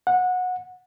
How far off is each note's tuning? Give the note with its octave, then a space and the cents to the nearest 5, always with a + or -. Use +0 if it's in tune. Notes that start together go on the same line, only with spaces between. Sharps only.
F#5 -20